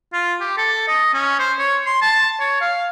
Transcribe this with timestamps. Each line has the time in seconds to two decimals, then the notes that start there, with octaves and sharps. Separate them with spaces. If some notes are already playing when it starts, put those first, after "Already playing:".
0.13 F4
0.41 G4
0.57 A4
0.88 D#5
1.14 C#4
1.39 C5
1.59 C#5
1.86 C6
2.02 A5
2.40 C#5
2.61 F5